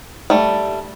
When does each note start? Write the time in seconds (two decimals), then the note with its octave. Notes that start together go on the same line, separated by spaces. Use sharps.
0.30 G3 A3